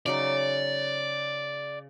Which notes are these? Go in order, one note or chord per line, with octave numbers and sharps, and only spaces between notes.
C#3 F#3 D#4 D5